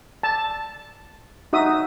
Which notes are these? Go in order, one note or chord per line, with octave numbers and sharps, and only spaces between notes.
A5
D#4 F#4 E5 D#6